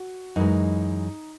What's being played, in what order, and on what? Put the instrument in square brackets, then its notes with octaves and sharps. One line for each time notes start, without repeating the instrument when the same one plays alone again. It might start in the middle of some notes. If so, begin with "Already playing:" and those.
Already playing: [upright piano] F#4
[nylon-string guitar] F#2 E3 G#3 [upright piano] D#4